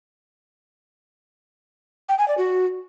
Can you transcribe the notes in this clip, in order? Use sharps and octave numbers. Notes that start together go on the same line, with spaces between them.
G5
G#5
D5
F#4